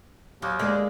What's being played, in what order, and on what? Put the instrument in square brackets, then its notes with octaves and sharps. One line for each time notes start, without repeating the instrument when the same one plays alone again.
[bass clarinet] D#2 [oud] F#3
[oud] D3 G#3 A#3